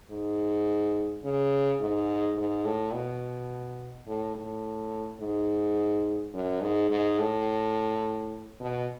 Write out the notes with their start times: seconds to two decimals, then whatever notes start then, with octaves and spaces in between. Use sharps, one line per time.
0.10 G#2
1.24 C#3
1.81 G#2
2.37 G#2
2.65 A2
2.93 B2
4.07 A2
4.35 A2
5.20 G#2
6.34 F#2
6.62 G#2
6.90 G#2
7.19 A2
8.60 B2